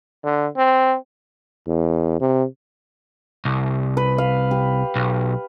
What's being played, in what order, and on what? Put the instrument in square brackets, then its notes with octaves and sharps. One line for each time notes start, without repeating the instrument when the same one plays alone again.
[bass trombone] D3
C4
E2
C3
[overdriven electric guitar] C2
[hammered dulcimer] B4
F5
G4
[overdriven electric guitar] B1